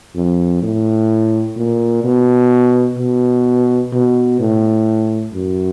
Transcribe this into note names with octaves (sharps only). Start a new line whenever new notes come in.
F2
A2
A#2
B2
B2
B2
A2
F#2